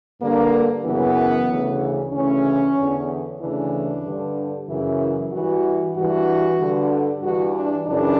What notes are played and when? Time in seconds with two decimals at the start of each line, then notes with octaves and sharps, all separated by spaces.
0.21 G2 D3 A#3
0.84 F#2 C#3 E3 B3
1.49 D2 C#3 E3
2.12 D2 C#3 E3 C#4
2.75 E2 D3
3.39 D2 C#3 E3 D4
4.04 G2 D3
4.67 F#2 C#3 E3 E4
5.31 G2 E3 F#4
5.94 G2 E3 F#4
6.58 G2 D3
7.22 G2 E3 F#4
7.54 D4
7.86 F#2 C#3 E3 D4